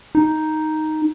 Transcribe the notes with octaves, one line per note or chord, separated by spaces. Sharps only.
D#4